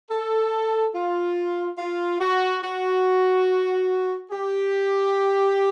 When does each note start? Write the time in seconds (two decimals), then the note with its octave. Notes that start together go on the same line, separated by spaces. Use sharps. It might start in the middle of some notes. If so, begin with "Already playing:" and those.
0.10 A4
0.94 F4
1.78 F4
2.20 F#4
2.63 F#4
4.31 G4